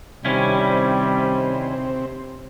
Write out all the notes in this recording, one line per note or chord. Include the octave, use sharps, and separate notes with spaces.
C3 D#3 G3 C4 C#4 E4